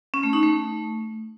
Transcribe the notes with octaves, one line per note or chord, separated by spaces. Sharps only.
C#4
A3
D#4
A3